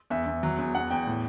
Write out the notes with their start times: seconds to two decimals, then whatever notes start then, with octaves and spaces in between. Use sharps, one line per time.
0.10 E2 E5
0.26 E2
0.43 F#3
0.58 E2
0.75 E2 F#5
0.90 E2 G5
1.07 A2